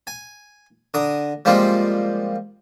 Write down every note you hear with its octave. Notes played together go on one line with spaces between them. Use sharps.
G#5
D3 A#5 D#6
F3 G3 G#3 A#3 C4 F4